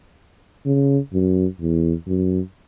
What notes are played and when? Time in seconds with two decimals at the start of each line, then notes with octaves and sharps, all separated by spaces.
0.66 C#3
1.13 F#2
1.61 E2
2.07 F#2